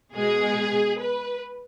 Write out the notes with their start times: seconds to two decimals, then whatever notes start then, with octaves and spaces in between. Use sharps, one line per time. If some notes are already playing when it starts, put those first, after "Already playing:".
0.14 B2 G#3 G#4
1.00 B4